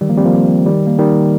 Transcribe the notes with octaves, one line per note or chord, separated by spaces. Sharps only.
D#3 G3
F3 A#3
G3 C4
F3 A#3
D#3 G3
A#3
D#3 G3